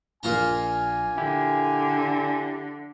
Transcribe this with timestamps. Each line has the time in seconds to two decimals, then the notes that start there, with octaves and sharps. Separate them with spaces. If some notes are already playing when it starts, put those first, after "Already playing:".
0.23 A#1 A#2 F4 G#5 A#5
1.18 D3 E4 G4